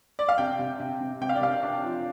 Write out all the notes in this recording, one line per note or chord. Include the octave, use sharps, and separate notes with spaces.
D5
F5
C3 G5
C3
C3
C3
C3 G5
F5
D5
C3 F5
D4
F3